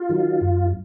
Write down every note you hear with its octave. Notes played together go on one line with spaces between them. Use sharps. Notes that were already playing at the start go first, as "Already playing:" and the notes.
Already playing: F4
D#3 F#3
F#2